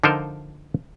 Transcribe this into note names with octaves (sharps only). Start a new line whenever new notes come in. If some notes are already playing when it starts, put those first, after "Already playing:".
D3 F3 D#4 F4 A#4 C5